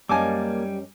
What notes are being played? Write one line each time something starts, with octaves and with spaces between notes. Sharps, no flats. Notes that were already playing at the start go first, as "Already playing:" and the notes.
F#2 G3 A#3 C#4 D#5 G#5 A5 D6